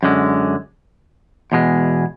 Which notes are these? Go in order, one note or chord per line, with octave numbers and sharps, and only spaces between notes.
F#2 D3 G#3
E2 B2 G#3